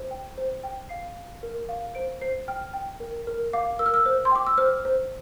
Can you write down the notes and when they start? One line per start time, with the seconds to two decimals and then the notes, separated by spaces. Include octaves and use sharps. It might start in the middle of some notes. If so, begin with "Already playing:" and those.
Already playing: C5
0.11 G5
0.38 C5
0.64 G5
0.89 F5 C7
1.16 F5
1.43 A#4
1.69 F5
1.95 C5 D7
2.22 C5 C7
2.48 G5 F6
2.73 G5
3.00 A#4
3.27 A#4
3.53 F5 D6
3.79 A#4 E6
3.86 F6
3.94 E6
4.06 C5
4.25 C6
4.31 G5 D6
4.47 E6
4.58 C5 F6
4.85 C5